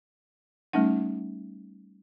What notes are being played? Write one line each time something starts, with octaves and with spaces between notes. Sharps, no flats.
G3 A3 C#4 D#4 F#5